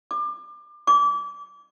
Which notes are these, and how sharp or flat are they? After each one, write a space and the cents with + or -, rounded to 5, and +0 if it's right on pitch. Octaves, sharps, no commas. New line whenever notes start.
D6 +30
D6 -30